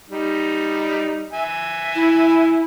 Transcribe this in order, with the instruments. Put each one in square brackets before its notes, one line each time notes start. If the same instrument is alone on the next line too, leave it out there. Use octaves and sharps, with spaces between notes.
[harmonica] G3 D#4
E5 G#5
[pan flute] E4